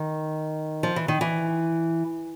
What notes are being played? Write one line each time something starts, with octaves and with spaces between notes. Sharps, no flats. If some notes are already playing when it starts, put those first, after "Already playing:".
Already playing: D#3
F3
E3
D#3
E3